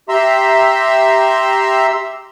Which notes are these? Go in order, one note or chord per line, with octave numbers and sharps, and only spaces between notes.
G4 E5 A#5 C6 E6